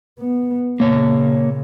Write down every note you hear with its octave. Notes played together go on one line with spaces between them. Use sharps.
B3
A#2 C#3 A#3 C#5